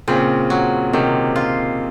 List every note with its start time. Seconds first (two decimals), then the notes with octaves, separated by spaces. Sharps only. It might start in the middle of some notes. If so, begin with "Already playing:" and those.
0.08 A#2 C#3 C4
0.50 F#3
0.93 C3 D#3
1.36 F4